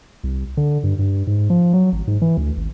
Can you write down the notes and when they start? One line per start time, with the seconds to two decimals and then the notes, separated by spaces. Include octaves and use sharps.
0.24 C2
0.57 D3
0.83 G2
0.99 G2
1.27 G#2
1.50 F3
1.73 F#3
1.93 G#1
2.07 G#2
2.22 E3
2.37 D2
2.57 G#1